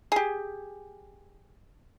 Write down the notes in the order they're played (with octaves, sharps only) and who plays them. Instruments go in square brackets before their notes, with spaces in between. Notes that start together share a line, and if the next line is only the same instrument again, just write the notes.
[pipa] G4 G#4